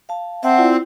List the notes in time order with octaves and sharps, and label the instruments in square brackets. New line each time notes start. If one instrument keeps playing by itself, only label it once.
[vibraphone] F5 A5
[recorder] C4 [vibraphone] E5 F#5 A5
[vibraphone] E4 F4 D5